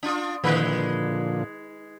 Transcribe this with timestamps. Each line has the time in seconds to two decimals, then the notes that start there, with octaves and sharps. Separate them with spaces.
0.03 D4 F4
0.44 A#2 D3 D#3 F3 G#3 B4